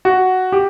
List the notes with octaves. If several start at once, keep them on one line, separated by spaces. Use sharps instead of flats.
F#4
G4